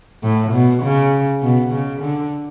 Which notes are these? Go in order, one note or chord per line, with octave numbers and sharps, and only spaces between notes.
A2
B2
C#3
B2
C#3
D3